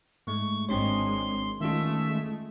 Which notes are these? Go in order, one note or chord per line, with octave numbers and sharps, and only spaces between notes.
G#2 G#3 A3 C#6
G#1 G#3 C4 D4 C#5 C6
D#3 G#3 A3 C#4 F4 E5